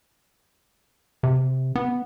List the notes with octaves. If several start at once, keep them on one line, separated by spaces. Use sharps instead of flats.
C3
B3